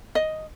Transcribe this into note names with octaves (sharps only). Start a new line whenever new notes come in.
D#5